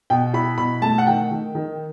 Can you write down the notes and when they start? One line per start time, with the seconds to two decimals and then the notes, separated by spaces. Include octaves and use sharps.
0.10 B2 G5
0.34 E4 B5
0.58 B2 B5
0.82 A3 A5
0.98 F#5
1.07 D#3 G5
1.31 D#3
1.55 D#3